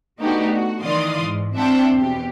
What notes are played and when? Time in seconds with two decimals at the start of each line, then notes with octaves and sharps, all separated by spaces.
0.20 A3 B3 D4 D#4 F#4 G4
0.50 F#4
0.82 D#3 E3 D5 F5 C6 D#6
1.23 G#2
1.55 C4 D4 E5 F#5 G5 A5
1.93 E2 B2 G4